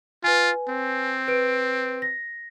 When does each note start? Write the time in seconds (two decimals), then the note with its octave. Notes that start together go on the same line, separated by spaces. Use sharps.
0.24 F4 B4 G#5
0.69 C4
1.28 B4 D7
2.02 A#6